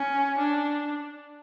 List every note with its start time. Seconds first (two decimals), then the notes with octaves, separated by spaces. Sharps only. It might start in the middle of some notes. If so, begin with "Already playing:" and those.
Already playing: C#4
0.38 D4